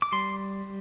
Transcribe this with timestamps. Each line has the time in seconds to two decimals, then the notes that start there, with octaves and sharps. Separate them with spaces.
0.02 D6
0.12 G3 C6